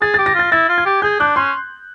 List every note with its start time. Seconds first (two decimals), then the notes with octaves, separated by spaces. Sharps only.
0.01 G#4 A6
0.14 A6
0.18 G4
0.26 A#6
0.34 F4 A6
0.51 E4 A6
0.69 F4
0.78 G#6
0.85 G4
1.02 G#4 G6
1.19 D4 F#6
1.36 C#4 C6